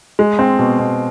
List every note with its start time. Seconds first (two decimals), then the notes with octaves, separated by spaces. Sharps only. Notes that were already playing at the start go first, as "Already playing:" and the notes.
0.19 G#3
0.39 C4
0.59 B2
0.79 B2